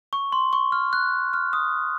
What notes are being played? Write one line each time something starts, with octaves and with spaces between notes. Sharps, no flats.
C#6
C6
C#6
F6
F#6
F6
D#6